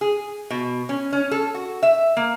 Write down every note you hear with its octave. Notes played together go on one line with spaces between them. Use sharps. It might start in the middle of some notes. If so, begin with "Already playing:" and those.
G#4
B2
C#4
C#4
A4
F#4
E5
A#3